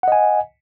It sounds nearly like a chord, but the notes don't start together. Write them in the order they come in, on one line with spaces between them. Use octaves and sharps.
F#5 D#5 G#5